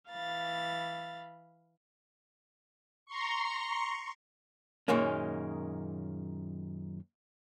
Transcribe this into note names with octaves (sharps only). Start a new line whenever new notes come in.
E3 F5 B5 A6
A#5 C6 C#6
F#2 A#2 D#3 G#3 A#3 C#4